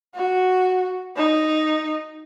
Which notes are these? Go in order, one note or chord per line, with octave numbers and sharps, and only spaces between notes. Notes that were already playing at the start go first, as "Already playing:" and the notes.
F#4
D#4